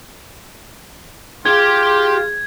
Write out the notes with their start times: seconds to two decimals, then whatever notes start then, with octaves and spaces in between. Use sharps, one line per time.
1.45 F4 G4 G#4 G5 G#6